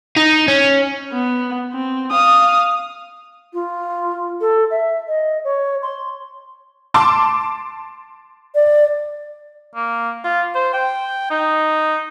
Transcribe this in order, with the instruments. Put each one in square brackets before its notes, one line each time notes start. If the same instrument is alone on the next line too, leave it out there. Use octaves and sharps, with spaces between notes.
[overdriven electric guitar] D#4
C#4
[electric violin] B3
C4
F5 D#6
[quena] F4
A4
E5
D#5
C#5
C6
[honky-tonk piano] A5 C6 D6
[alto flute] D5
[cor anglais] A#3
F4
C5
G5
D#4